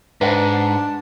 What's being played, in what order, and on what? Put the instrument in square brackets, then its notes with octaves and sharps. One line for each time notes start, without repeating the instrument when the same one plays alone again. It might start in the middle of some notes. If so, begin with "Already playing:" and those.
[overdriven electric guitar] G#2 [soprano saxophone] D4 [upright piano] B4 C5 F#5